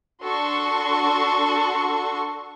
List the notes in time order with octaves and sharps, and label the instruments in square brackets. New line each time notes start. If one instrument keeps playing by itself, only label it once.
[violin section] D4 F#4 A4 C6 C#6